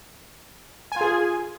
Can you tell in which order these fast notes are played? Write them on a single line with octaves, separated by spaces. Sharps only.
G#5 F4 G#4